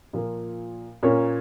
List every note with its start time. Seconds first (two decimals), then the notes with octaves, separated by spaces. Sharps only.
0.13 A#2 F3 A#3
1.03 A#2 A#3 C#4 C#5